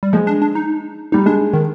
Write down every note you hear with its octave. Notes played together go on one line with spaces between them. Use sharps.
G3
F3 G#3
D4
D4
D#4
G3 D#4
G#3 D4
D#3